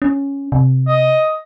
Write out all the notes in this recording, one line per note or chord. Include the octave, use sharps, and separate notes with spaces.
C#4
C3
D#5